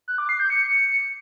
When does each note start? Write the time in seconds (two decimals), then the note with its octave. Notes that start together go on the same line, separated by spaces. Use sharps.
0.08 F#6
0.18 D6
0.29 C7
0.40 G6
0.50 C#7